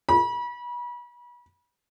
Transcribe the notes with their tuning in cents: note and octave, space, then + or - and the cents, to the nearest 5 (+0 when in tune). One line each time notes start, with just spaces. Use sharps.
B5 -35